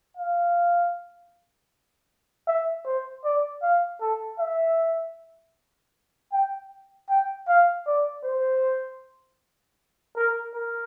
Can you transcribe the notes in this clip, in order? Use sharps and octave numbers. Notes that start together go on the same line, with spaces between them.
F5
E5
C5
D5
F5
A4
E5
G5
G5
F5
D5
C5
A#4
A#4